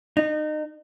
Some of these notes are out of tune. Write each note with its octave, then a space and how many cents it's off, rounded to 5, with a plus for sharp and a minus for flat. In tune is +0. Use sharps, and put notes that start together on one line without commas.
D#4 -30